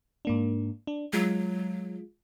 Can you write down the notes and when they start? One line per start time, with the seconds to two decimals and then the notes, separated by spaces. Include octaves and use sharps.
0.25 G#2 A#3 D4
0.87 D4
1.13 F#3 G#3 F4